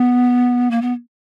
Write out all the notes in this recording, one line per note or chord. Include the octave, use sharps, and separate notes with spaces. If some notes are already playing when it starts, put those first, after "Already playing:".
Already playing: B3
A#3
B3